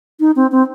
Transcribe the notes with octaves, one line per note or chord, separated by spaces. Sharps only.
D#4
C4
C4